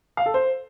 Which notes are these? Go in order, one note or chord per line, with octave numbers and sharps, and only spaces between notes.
F5
A4
C5